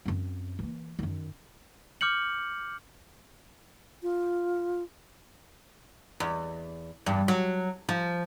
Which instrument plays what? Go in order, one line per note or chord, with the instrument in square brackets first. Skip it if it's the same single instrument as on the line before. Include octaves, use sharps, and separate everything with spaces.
[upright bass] F#2 C4
E3 A#3
F#2 D#3
[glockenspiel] D6 F6 G6 C#7 F#7
[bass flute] F4
[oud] E2
E2 G2
F#3
F3